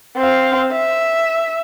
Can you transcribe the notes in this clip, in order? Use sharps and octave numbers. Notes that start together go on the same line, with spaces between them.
C4 F5
E5